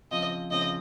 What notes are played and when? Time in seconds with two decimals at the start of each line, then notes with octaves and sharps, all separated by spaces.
0.11 C#3 F3 C4 D#5
0.51 C#3 F3 C4 D#5